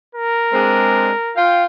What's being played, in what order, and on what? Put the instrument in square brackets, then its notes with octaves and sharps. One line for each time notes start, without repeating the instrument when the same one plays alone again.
[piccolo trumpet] A#4
[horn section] G#3 C4 D4
F4 F5 G5